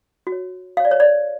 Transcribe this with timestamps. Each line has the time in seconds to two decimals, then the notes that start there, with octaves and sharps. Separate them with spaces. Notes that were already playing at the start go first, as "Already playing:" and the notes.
0.27 F#4
0.32 C#5
0.77 F#4 F5
0.80 C#5
0.85 D5
0.91 C#5
1.00 D5